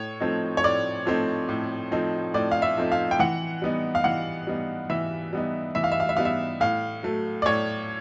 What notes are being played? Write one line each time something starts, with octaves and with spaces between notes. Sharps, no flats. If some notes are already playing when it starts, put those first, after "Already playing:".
Already playing: A2 C#5
F3 A3 C4 D#4
C#5
A2 D5
F3 A3 C4 D#4
A2
F3 A3 C4 D#4
A2 D5
F5
E5
F3 A3 C4 D#4
F5
G5
E3 F#5
G3 B3 D#4
F5
E3 F#5
G3 B3 D#4
E3 E5
G3 B3 D#4
E3 E5
F5
E5
F5
E5
G3 B3 D#4 F5
E5
A2 F5
F#3 A3
D5
A2 C#5